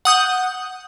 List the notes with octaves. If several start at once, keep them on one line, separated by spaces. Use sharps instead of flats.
F#5 D#6 G6